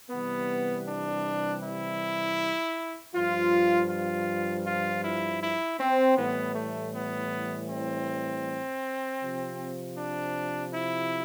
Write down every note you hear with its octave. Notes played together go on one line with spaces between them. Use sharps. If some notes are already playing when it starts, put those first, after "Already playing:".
C3 E3 G3 B3
D4
E4
G2 F3 F4
F4
F4
E4
E4
C4
A2 E3 G3 B3
A3
B3
C4
C3 F3
D4
E4